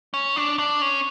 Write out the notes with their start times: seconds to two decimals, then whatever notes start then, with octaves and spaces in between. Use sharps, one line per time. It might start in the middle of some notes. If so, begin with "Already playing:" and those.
0.14 C#4
0.36 D4
0.59 D4
0.82 C#4